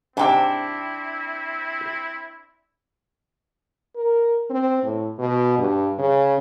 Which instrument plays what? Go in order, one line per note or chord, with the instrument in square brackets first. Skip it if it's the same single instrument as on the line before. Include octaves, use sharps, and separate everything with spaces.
[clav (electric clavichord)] G#2 C3 [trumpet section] C4 E4 [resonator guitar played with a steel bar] D4 G5
[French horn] A#4
C4
A2
B2
G2
C#3